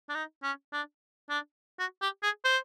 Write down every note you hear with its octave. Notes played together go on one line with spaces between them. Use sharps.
D4
D#4
C#4
D4
D4
F#4
G4
G#4
C5